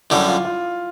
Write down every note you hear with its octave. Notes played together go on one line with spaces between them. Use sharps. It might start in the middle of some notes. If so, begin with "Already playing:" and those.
F#2 D3 G3 E4
F4
F4